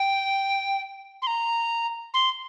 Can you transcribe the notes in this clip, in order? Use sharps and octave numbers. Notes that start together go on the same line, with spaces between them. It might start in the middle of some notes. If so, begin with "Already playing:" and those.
Already playing: G5
C6
A#5
C6